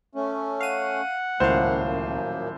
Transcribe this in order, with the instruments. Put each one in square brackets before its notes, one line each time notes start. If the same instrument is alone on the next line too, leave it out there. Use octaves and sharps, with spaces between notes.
[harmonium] A3 C#4
[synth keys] F5 D#7 [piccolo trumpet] F#5
[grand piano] D#1 A2 C5 [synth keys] C#2 F5 [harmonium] F#2 F3 A#3